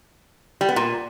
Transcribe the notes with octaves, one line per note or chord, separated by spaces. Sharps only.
G3
B3
A#2